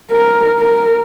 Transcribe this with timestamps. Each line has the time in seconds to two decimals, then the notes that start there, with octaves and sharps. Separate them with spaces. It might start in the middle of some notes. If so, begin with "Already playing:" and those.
0.11 A#4
0.59 A#4